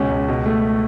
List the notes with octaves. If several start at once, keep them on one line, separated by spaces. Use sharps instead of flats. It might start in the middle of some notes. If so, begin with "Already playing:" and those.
Already playing: C#2 B2 C#4
C#2
B2
A3